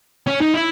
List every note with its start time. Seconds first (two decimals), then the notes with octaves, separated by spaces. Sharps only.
0.27 C#4
0.41 D#4
0.54 E4